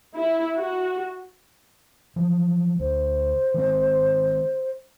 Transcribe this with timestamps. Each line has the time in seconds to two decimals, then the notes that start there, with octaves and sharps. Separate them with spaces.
0.16 E4
0.57 F#4
2.16 F3 F#3
2.80 D2 C5
3.54 D#3 G#3 C4